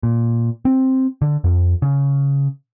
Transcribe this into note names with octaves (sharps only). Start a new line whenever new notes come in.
A#2
C4
D3
F2
C#3